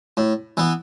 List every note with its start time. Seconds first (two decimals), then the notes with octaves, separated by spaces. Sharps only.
0.17 A2
0.57 E3 B3